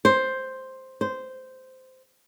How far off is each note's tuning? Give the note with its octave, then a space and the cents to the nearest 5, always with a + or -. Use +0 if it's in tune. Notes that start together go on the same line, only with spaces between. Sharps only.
C5 +5
C5 -10